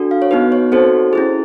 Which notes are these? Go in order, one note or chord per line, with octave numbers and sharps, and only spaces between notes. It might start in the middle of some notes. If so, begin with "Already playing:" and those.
Already playing: D4 F#4 A4
F5
C#5
B3 D#4 F#4 B4
C#5
C4 D#4 F#4 A4 C5
C#4 E4 G#4